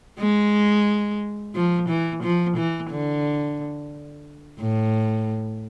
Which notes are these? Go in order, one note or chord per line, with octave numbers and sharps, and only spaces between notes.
G#3
F3
E3
F3
E3
D3
A2